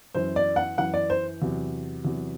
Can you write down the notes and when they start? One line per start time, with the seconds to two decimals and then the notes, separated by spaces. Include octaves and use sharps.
0.14 F#2 E3 C5
0.36 D5
0.56 F#5
0.77 F#2 E3 F#5
0.94 D5
1.10 C5
1.42 E2 C3 F#3
2.05 E2 C3 F#3